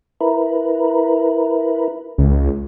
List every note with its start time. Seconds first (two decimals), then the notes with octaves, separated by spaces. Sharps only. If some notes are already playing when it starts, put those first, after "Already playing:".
0.21 E4 A#4 B4
2.18 C#2